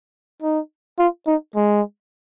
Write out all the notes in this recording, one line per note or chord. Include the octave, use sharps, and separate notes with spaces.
D#4
F4
D#4
G#3